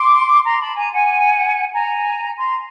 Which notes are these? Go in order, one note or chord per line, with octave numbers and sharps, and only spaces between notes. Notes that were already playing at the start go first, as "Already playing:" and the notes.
Already playing: C6 D6
A#5 C6
A5 B5
G#5 A#5
F#5 G#5
G#5 A#5
A#5 C6